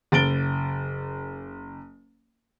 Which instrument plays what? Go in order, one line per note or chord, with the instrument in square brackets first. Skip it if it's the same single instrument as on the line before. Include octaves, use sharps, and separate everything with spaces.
[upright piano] F#1 A6 D7 G7